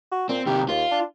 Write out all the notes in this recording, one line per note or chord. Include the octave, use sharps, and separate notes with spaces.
F#4
A#2 C4
C3 D#3 G4
D#2 F4
D4